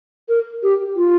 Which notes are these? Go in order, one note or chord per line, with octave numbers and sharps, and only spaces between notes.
A#4
G4
F4